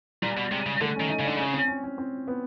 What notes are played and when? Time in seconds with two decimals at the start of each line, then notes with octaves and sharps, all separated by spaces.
0.22 A#2 G3
0.37 B2
0.51 C3 G#3
0.66 C#3
0.81 D3 A3
0.96 D#3 C#4
1.10 D#4
1.20 C#3
1.25 D3 D4
1.37 C#3 C#4
1.53 C4
1.68 C#4
1.84 C#4
1.98 C4
2.28 B3